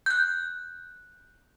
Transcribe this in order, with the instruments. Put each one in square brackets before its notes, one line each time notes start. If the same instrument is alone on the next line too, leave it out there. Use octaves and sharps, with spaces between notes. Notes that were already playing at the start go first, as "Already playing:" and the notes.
[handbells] F#6 G6